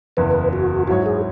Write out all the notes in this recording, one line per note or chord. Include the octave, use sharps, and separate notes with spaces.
F#1 E2 E3 B4
F#4
G#2 F#3 E4 F#4 C#5
G#4